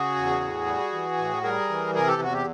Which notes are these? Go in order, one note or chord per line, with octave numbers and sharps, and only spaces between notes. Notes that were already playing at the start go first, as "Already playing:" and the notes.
Already playing: C#3 F#4 G#4
E2
A2
G3
E3
A2
G3 G#4 A#4
E3
C3 G#4 A#4
G4 A4
E2 F#4
G4